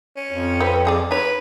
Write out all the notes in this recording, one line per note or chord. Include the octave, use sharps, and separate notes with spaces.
C#4
F2
C4 B4
C4 G#4 D5
D#4 B4 C#5